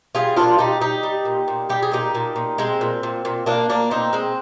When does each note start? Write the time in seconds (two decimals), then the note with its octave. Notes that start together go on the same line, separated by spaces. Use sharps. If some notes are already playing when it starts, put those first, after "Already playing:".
0.15 G3 F4 G#4
0.36 A#2 D4 F4
0.58 G3 D#4 G4
0.80 G3 D#4 G4
1.03 G3
1.25 A#2
1.48 A#2
1.69 G3 G4
1.82 G#4
1.92 A#2 D#4 G4
2.15 A#2
2.36 A#2
2.58 G#3 C4
2.81 A#2
3.03 A#2
3.25 A#2
3.46 A#2 A#3 D4
3.69 A#2 A#3 D4
3.91 A#2 C4 D#4
4.13 G#3 C4